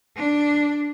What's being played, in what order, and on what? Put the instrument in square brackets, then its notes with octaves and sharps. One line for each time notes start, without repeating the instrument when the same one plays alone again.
[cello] D4